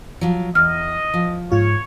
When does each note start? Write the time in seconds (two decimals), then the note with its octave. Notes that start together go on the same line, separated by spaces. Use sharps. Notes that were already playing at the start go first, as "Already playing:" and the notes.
0.21 F3 F#3
0.55 E2 D#5 F6
1.14 F3
1.52 G#2 F4 C#5